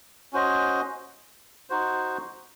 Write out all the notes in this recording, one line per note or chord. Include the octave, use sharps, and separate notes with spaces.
C#4 F#4 C5 D#5
D#4 F#4 C5